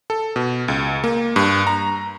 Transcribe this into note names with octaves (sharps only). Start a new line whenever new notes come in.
A4
B2
C#2
A#3
G2
A#5